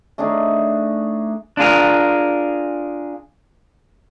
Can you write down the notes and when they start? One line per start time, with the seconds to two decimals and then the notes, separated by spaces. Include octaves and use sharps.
0.18 A3 D4 D#4 G#4
1.57 D4 F4 G#4 A#4